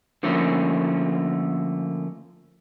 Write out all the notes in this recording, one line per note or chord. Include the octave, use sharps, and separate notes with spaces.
D3 F3 A3 A#3 C#4